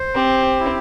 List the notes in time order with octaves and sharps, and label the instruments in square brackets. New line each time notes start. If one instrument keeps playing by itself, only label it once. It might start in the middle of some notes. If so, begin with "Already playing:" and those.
Already playing: [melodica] C5
[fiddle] C4 [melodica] G4
[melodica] E4